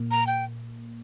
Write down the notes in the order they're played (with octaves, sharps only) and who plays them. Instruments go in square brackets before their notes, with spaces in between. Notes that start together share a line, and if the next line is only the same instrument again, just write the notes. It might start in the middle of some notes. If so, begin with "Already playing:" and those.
Already playing: [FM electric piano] A#2 A#3
[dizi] A#5
G5